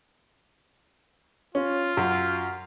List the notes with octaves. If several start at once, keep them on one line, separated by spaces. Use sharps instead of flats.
C#4 F4
F#2